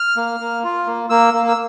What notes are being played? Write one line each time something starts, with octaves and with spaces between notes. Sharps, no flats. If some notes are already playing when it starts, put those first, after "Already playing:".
Already playing: F6
A#3
A#3
F4
A#3
A#3 E6
A#3
E6